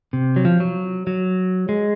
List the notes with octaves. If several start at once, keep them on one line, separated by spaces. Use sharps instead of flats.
C3
F#3
F3
F#3
F#3
G#3